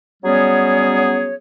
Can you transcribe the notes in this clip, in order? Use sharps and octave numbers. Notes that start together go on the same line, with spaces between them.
F#3 G3 B3 C#4 G#4 C#5